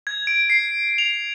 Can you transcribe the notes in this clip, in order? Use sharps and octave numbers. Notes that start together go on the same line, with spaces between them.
G#6
D7
C7
F7